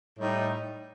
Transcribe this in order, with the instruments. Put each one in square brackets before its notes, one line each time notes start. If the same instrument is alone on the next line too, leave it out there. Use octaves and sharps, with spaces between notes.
[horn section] A2 G3 D#4